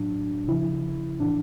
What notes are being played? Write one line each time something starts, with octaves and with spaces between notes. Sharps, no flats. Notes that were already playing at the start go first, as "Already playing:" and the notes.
Already playing: A2 F#3 D4
C#3 F3 E4
A2 E3 D4